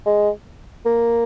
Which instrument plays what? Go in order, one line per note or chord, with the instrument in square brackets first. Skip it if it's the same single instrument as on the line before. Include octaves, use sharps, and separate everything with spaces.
[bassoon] G#3
A#3